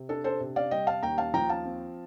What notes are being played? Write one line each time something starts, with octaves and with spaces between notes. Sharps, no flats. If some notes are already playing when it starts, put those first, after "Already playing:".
Already playing: C3
D4 A4
A4 C5
C3
D5 F5
G3 D#5 G5
F5 A5
D#2 G5 A#5
F5 A5
F3 G5 A#5
F5 A5
C4